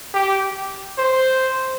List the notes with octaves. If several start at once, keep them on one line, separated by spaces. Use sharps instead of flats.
G4
C5